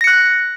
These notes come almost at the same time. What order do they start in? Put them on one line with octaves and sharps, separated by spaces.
A#6 C#7 F#6